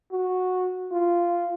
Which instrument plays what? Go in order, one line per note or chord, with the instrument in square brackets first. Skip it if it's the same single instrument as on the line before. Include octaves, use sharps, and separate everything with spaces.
[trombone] F#4
F4